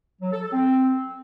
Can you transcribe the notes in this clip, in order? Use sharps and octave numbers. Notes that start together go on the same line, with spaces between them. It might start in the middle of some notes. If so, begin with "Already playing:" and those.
F#3
A4
A4
C4